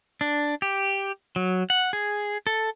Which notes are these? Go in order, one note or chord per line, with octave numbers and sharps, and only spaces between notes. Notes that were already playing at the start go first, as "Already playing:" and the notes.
D4
G4
F#3
F#5
G#4
A4